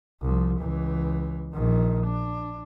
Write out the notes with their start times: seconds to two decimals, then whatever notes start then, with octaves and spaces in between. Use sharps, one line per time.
0.22 C2 F3
0.59 C#2 E3
1.54 A#1 D#3
2.06 D4